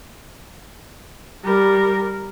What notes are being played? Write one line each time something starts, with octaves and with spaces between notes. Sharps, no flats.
G3 A#4